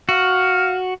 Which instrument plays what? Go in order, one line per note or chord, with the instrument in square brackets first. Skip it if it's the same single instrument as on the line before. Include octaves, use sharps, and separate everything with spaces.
[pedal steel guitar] F#4 [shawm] F5